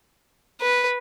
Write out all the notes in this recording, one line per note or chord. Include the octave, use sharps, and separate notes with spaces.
B4